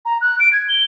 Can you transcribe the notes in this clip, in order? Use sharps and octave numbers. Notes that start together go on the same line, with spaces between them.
A#5
F#6
D7
G#6
G7